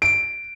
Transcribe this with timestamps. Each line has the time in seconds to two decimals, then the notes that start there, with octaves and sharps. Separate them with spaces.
0.02 D7